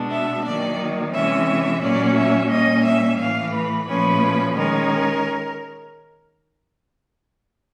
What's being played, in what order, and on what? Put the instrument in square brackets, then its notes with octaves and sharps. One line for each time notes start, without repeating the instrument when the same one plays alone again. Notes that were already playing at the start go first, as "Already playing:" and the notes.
Already playing: [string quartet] B2 G#3 B3 D4
E5
D#3 F#3 A#3 D5
C3 E3 G#3 C#4 E5
A#2 F#3 A#3 C#4 D5
E5
A#2 G3 A#3 C#4 D#5
E5
A2 E3 A3 F5
B4
A#2 F3 A3 C#4 B4
D#3 G#3 C#4 A#4